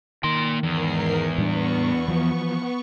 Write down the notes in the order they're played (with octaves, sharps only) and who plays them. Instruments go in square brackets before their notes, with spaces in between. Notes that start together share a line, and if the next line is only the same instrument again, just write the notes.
[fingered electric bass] D#3 [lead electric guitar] A#3 C6
[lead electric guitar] E2 [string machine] G#2 A#4 C7
[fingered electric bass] A2 G3 D4 [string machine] B3 C#6
[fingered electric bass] E3 F3